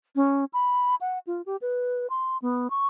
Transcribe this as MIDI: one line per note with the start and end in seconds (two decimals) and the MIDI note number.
0.16 0.45 61
0.53 0.95 83
1.01 1.19 78
1.27 1.42 65
1.46 1.57 67
1.62 2.07 71
2.10 2.37 84
2.42 2.70 59
2.70 2.87 85